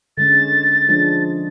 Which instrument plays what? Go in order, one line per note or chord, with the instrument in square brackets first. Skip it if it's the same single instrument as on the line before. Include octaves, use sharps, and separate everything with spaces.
[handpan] D3 G#3 C#4 [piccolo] A6
[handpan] F3 G#3 D4